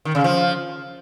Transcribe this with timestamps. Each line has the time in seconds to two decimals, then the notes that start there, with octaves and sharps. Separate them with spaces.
0.05 D#3
0.15 C#3
0.24 F3